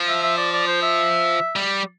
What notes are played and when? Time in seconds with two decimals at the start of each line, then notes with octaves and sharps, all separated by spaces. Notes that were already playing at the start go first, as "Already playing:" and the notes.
Already playing: F3
0.08 E5
0.23 E5
0.38 D5
0.52 D5
0.67 C5
0.82 E5
1.56 G3